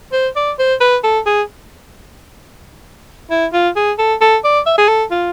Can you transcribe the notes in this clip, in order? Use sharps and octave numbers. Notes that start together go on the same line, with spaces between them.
C5
D5
C5
B4
A4
G#4
E4
F4
G#4
A4
A4
D5
E5
G#4
A4
F4